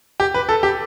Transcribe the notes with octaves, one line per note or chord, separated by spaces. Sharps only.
G4
B4
A4
G4